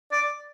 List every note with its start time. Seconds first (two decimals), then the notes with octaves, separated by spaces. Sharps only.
0.12 D5